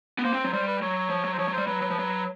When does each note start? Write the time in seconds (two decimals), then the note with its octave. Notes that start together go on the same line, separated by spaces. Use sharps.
0.18 B3
0.24 A#3 C5
0.34 C4
0.44 F#3
0.53 G3 C5
0.68 B4
0.82 F#3 C#5
1.09 F3
1.24 F#3
1.33 C5
1.39 F3 C#5
1.48 F#3
1.53 G3 C5
1.67 F#3 B4
1.82 F#3
1.90 F3
1.99 F#3